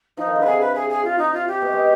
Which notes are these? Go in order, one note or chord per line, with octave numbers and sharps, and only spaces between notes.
F3 D#4
D#3
D3 B4
C3 G#4
B4
G#4
G#4
F4
D#4
F4
G4
B2
G#3